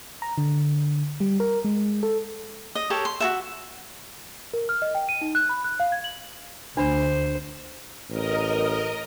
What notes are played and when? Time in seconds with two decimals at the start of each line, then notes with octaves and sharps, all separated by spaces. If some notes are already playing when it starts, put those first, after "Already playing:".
0.22 A#5
0.38 D3
1.20 G3
1.40 A#4
1.65 G#3
2.03 A4
2.75 D#5
2.90 G4 A4 A#4 C#5
3.05 C6
3.20 F#4 A4 E5
4.53 A#4
4.69 F6
4.82 D#5
4.95 G5
5.09 D#7
5.21 D#4
5.35 F#6
5.49 B5
5.64 F#6
5.80 F5
5.92 G#6
6.04 F#7
6.77 D2 D4 C5 B5
8.10 A1 A#4 D#5